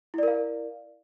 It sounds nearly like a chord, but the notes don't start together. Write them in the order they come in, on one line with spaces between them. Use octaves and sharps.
E4 D5 A#4 F5